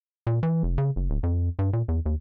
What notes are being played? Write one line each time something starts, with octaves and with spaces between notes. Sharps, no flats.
A#2
E3
F1
C#3
F#1
D1
F2
G2
A#2
E2
D#2